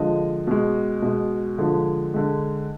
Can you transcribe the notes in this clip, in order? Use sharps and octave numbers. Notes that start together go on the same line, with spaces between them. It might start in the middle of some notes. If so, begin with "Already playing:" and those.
Already playing: D3 F3 G#3 D#5
B2 G#3
B2 G#3
D3 F3 G#3
D3 G#3